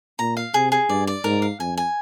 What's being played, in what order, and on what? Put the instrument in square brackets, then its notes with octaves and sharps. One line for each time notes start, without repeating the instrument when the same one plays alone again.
[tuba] A#2 [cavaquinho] A#5
[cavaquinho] F5
[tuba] C3 [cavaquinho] G#4
[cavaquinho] G#4
[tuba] G2 [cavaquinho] D5
[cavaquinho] D5
[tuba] G#2 [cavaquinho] A#4
[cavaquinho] F5
[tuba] F2 [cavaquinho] G#5
[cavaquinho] G#5